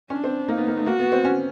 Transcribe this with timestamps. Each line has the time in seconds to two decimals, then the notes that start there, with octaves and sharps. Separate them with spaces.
0.10 C#4 D4
0.24 C4
0.48 A#3 D#4
0.57 B3
0.67 A#3
0.77 A3
0.86 A#3 F#4
0.99 B3
1.12 C4
1.24 C#4